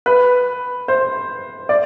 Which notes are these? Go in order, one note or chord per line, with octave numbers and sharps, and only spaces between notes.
B4
C5
D5